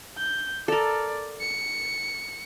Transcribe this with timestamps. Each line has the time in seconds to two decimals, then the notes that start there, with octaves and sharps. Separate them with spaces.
0.18 G6
0.68 A4 A#4 D5
1.41 C#7